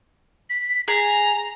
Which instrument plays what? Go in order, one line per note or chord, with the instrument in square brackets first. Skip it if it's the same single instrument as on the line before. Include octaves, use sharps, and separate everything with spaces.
[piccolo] B6
[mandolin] G#4 [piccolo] A#5